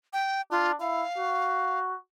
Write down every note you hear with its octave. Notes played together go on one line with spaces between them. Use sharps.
G5
D4 F4
E4 F5
F#4